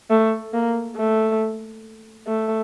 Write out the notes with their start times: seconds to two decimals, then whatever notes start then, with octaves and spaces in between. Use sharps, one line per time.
0.10 A3
0.53 A#3
0.96 A3
2.27 A3